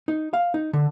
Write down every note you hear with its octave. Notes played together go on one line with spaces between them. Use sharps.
D#4
F5
D#4
D3